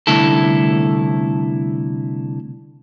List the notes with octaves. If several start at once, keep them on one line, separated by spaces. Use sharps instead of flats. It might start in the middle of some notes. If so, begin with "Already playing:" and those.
C2 G#2 D3 A3 E4 A4